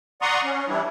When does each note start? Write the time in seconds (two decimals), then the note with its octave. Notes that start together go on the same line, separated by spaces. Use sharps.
0.22 D5 F#5 A#5 C6 C#6 D#6
0.44 C#4
0.68 E3 G3 D4 E4